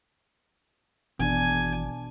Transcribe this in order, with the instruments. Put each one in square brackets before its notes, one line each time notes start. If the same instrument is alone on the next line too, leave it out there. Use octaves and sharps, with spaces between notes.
[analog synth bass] G#1 [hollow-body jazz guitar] E2 [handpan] B2 D4 [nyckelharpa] G#5